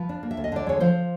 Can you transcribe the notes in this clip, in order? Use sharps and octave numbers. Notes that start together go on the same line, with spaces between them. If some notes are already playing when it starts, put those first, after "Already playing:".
Already playing: F3 B4
D4
A#3
E5
D2
D#5
D3 D5
G#3 C#5
F3 C5